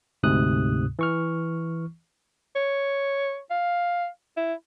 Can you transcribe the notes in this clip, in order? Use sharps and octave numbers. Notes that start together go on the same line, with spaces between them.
D2 G#2 C3 D#6 F#6
E3 C#6 F6
C#5
F5
E4